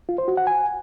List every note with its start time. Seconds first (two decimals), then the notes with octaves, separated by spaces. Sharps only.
0.09 F4
0.18 C5
0.28 F#4
0.37 F#5
0.47 G#5